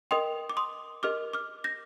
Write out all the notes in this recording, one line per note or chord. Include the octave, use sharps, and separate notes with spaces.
A#4 D#5 G5 C6 D#6
D6
C6 D#6
G4 A#4 D#5 D6 F6
D6 F6
G6 A#6